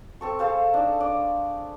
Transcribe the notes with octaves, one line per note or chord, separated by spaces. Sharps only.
C4 A4 C#6
G#4 A4 C5 F5
D4 D#4
D4 D5